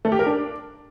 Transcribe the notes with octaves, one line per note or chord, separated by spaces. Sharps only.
A3
G4
A#4
D4